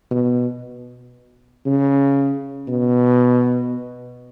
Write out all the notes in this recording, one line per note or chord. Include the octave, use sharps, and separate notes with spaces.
B2
C#3
B2